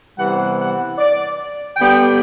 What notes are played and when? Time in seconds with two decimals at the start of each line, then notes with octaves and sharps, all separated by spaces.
0.17 C3 E3 G3 B3 F#5
0.58 F#5
0.98 D5
1.77 D3 G3 B3 G5